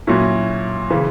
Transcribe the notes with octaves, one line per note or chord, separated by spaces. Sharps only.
A#2 F#3 C#4 E4
C#3 E3